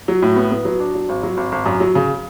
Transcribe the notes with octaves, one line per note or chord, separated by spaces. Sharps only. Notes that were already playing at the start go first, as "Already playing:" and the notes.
F#3
A2
B3
B3
F#3
D4
F#3
G#1
F#3
G#1
G#1
F#2
F#3
C#3